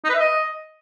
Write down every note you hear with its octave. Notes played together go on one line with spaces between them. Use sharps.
D#4
B4
E5
D#5